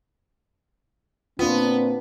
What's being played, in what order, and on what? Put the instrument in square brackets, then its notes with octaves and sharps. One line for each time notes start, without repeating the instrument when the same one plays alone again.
[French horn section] A#2 C4 [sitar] B3 [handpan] D4 F4